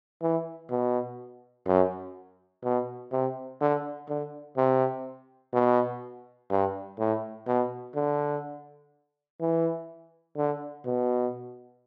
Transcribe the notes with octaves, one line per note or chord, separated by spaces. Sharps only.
E3
B2
F#2
B2
C3
D3
D3
C3
B2
G2
A2
B2
D3
E3
D3
B2